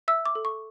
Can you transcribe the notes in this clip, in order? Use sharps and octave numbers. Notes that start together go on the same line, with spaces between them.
E5 E6
D6
A4
C#6